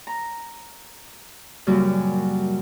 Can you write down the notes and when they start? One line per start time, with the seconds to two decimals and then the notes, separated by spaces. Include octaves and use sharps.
0.07 A#5
1.67 F#2 A#2 C#3 F#3 G3